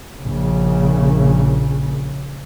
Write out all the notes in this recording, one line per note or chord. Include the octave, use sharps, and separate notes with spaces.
A#1 C#3